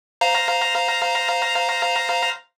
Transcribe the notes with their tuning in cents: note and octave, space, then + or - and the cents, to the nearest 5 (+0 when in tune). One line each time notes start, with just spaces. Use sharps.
C5 -15 F5 +0 A#5 +0